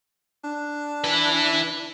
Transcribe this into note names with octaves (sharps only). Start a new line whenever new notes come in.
D4
E4 B4